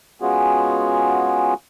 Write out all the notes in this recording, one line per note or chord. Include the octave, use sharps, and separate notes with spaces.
G#3 B3 C#4 F4 F#4 G#4